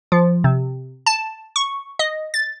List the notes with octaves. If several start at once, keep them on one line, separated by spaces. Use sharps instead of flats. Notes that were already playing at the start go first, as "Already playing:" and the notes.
F3
C3
A5
C#6
D#5
A6